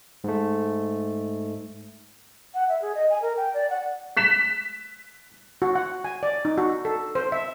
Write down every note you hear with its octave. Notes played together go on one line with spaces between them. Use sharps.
G#2 A3
F#5
E5
G#4
D#5
G#5
A#4
G5
D5
F#5
F#6 B6 E7
F#4
F#5
G#5
D5
D#4
F#4
A4
C5
E5